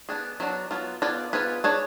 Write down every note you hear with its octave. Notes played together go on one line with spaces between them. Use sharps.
B3 D4 G#4
F#3 B3 D4 F#4
F#3 B3 F4
B3 F4 G#4 D5
B3 F4 G#4 B4
D4 G#4 C#5